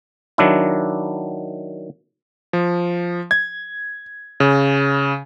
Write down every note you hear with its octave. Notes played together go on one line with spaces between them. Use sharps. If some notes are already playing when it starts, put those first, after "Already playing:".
D#3 F#3 D4 E4
F3
G#6
C#3